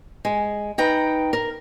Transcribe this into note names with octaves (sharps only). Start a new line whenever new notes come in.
G#3
D#4 B4 G5 A#5
A#4